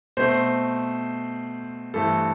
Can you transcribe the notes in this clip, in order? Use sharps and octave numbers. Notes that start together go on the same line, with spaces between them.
B2 A3 C4 C5
G2 E3 A3 C4 A4